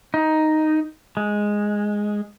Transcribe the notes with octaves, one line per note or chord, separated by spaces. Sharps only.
D#4
G#3